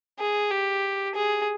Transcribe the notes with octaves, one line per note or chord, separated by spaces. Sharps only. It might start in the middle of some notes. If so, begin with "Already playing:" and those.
G#4
G4
G#4